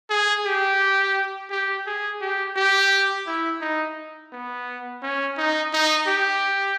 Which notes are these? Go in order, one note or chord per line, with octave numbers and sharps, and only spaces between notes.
G#4
G4
G4
G#4
G4
G4
E4
D#4
B3
C#4
D#4
D#4
G4